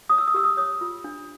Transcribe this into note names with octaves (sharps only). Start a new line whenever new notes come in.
C#5 D#6
E6
D#6
G4 E6
D#6
C#5 D#6
F4
D4